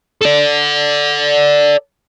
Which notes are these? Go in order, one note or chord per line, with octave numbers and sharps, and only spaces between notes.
A4 D5